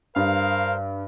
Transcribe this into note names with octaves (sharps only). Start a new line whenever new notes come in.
G2 A#4 C5 F5